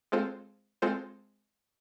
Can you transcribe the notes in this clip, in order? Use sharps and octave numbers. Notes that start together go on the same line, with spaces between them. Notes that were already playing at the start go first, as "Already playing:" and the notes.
G#3 C4 F4 A4 C5
G#3 C4 F4 A4 C5